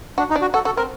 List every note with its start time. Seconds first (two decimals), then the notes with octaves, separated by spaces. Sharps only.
0.18 D4 F#4
0.30 D#4
0.35 D4
0.41 F#4
0.54 F#4 A4
0.65 F#4 A4
0.77 C4 A#4